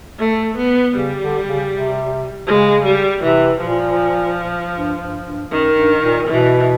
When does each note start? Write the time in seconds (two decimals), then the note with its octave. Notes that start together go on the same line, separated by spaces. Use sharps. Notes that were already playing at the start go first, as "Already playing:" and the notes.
0.19 A3
0.58 B3
0.95 C#3 G3
1.21 D3
1.46 C#3
1.72 C3
2.47 C#3 G#3
2.85 G3
3.23 C3 E3
3.61 A#2 F3
4.76 G2
5.01 G2
5.26 G2
5.51 F#2 D#3
5.76 G2
6.02 A#2
6.27 B2 E3